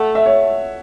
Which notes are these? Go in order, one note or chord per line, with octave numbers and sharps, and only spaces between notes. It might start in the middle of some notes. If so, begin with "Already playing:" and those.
Already playing: A3 F#5
E5
C#5